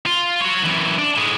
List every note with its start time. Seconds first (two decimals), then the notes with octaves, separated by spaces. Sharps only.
0.06 F4
0.40 F#4 C#5
0.63 F#2 E3
0.99 D4
1.18 A2 G#3